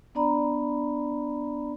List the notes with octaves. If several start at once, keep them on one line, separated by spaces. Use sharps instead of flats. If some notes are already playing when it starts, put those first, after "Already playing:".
B3 D4 D5 A#5 B5